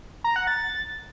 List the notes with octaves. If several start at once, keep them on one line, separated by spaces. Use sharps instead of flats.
A#5
F#5
A6